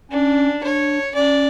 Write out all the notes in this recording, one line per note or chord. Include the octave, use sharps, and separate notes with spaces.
C#4 D4
D4 C#5
C#4 D5